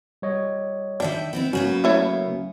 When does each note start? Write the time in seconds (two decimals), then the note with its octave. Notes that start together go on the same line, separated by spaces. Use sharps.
0.22 G3 C#5 D#5
1.00 D#3 D4 E5 G5
1.33 B3 C4 E4
1.53 C#3 F#3 A#3 B3 C#4 F#4
1.84 A3 E4 C#5